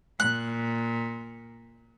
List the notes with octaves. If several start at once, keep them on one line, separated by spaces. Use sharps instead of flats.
A#2 F#6